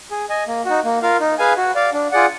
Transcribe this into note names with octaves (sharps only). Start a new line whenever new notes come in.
G#4
D#5 G#5
A#3
D#4 F#4
A#3
F4 A#4 F5
D#4
G#4 B4 F5 G#5
F#4
D5 F5
D4
F4 G#4 D5 F#5